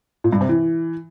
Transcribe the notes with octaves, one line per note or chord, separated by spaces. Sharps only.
A#2
G2
C3
E3